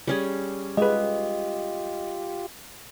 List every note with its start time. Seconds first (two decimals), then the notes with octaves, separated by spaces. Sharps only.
0.07 G3 C#4 G#4
0.77 G#3 F4 G4 B4 D#5